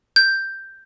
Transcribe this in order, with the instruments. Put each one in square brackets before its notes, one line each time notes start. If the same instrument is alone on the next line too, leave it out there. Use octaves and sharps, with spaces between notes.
[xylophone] G6